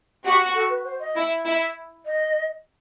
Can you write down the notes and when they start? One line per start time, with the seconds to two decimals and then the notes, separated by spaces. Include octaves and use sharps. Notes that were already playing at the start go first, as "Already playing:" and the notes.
0.24 F#4 G4
0.55 A4
0.69 B4
0.85 C5
1.00 D#5
1.15 E4
1.45 E4 E5
2.06 D#5